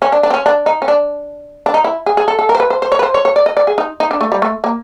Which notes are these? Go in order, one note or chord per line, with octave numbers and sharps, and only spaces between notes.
C#4
D4
D4
C4
C#4
D4
D#4
C#4
D4
D4
D#4
E4
G#4
G#4
A4
A4
A#4
C5
B4
C5
C5
C#5
B4
C5
C#5
C#5
D5
D#5
D5
G#4
D#4
D#4
D4
A3
G3
A3
A#3